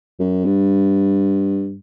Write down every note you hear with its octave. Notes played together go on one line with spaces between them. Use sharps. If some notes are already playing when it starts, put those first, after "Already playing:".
F#2
G2